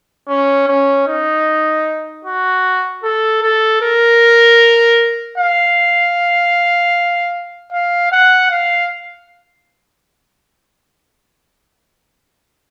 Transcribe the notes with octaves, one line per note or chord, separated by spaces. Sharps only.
C#4
C#4
D#4
F#4
A4
A4
A#4
F5
F5
F#5
F5